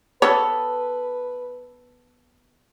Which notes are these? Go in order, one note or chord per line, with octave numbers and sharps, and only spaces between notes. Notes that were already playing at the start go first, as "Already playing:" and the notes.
B3 A4 B4 C#5